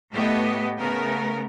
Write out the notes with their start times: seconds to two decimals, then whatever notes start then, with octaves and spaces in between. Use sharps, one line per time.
0.13 A2 A3 B3 G4 D#5
0.79 C#3 A3 B3 A#4